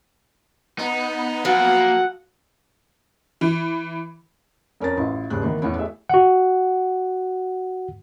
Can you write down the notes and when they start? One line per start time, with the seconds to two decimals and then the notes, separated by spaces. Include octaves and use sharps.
0.79 B3 D#4
1.45 F3 F#3 A#3 F#4 F#5
3.41 E3
4.80 F2 C#4 A#4 B4 A6
4.97 A1 E4 F4 D#5
5.30 G#1 D#2 C#3 G3 G#4 F#6
5.43 D#3 E3 A#3 B3
5.62 E2 A2 E3 B3 C#4 E4
5.75 A3 E4 G4 G#4 E5
6.10 F#4 F#5